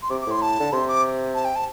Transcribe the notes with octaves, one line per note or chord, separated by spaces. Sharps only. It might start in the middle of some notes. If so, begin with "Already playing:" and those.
C6
C3 D6
D6
A2 C6
A5
D3
C3 C6
D6
A5
G5
A5